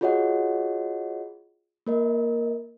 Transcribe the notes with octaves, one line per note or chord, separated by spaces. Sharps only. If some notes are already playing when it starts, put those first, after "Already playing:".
F4 F#4 G#4 C#5 D#5 F#5
A#3 A#4 D#5